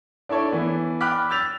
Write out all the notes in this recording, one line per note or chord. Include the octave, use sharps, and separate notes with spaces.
D4 E4 A4 C#5 D5
E3 B3 D5
G5 B5 D6 F6 F#6 B6
E6 G6 A6 B6 F7